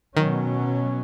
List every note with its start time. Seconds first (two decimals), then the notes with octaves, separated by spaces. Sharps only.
0.16 B2 D#3 F#3 C#4